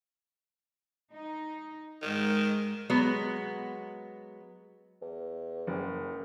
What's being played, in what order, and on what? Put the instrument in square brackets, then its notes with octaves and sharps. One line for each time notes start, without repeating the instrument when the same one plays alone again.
[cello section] D#4
[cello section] G#2 [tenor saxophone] D#3
[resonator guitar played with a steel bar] F#3 G#3 B3
[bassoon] E2
[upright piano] F#1